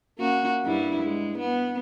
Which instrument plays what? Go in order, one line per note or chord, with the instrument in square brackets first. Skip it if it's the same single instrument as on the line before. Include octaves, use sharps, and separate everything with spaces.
[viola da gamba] A#3 C#4 F#4
G2 G3 E4
G#3
B3